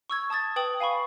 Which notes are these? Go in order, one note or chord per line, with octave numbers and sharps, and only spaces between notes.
C#6 E6 G#6
A5 D#6 G#6 A6
B4 G5 D#6 F#7
F5 G#5 B5 C#6